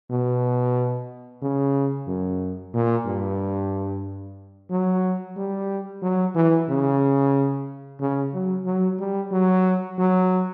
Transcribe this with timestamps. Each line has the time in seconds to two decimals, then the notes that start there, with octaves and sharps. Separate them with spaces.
0.10 B2
1.42 C#3
2.07 F#2
2.73 A#2
3.06 G2
4.70 F#3
5.36 G3
6.02 F#3
6.35 E3
6.69 C#3
8.00 C#3
8.33 F#3
8.65 F#3
8.99 G3
9.31 F#3
9.98 F#3